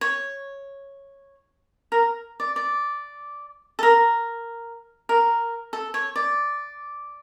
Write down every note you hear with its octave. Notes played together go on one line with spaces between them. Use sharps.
C#5
A#4
D5
D5
A4
A#4
A#4
A4
C#5
D5